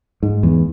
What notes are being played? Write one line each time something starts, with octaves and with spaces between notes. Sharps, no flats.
G#2
E2